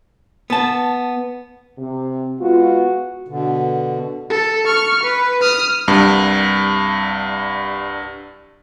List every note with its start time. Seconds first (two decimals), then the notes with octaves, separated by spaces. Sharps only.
0.50 B3 A5
1.78 C3
2.40 G#3 B3 F4 F#4
3.28 B2 D3
4.30 A4
4.66 C#6 F6
5.03 B4
5.42 D#6 F6
5.88 C2 G2